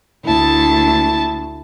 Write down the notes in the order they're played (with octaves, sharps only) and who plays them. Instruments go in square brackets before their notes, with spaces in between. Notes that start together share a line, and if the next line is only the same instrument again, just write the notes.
[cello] D2 [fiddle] E4 A5